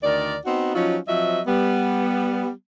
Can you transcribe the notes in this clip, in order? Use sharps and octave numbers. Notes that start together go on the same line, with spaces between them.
D2 D#3 A#4 D5
B3 C4 D#4 F#4
F3 F#3 C#4 D#4 F4
F3 F#3 C4 D#5 E5
G3 B3